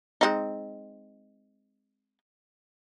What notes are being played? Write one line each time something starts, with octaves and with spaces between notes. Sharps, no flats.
G#3 C4 D#4